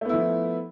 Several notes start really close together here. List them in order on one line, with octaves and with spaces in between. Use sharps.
A3 B3 E4 F3